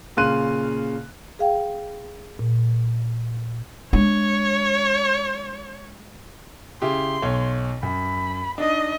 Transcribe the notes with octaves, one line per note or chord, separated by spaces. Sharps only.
A#2 C#3 F5 C6 F#6 D#7
G#4 F5 G5
A#2
G#3 D4 C#5
C#3 E4 G4 C6
B1 C#5
F#2 B5
D4 D#4 D#5